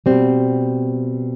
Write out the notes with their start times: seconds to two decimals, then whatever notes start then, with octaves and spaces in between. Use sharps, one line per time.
0.06 B2 G3 C4